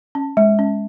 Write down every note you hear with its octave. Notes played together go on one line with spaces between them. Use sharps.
C#4
G#3
C#4